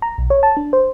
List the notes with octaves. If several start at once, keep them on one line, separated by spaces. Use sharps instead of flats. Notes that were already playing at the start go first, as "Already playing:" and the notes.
A#5
B1
C#5
A5
D4
C5